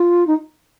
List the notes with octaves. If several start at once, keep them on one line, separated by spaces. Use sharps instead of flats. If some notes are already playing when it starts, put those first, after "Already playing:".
Already playing: F4
D#4